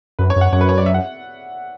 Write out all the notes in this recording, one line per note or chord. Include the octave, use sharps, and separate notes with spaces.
F#2 B4
C#5
F#2
F#5
F#2 C#5
B4
C#5
D5
E5
F#5